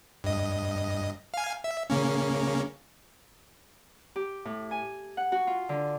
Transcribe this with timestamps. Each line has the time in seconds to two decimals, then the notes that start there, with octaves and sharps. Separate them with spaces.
0.24 G2 D#5
1.34 F5 G#5
1.64 E5
1.90 C#3 A#3 C#4
4.16 G4
4.45 A2
4.71 G#5
5.17 F#5
5.32 F#4
5.47 F4
5.69 D3